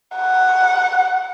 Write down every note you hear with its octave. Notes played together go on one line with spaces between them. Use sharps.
F#5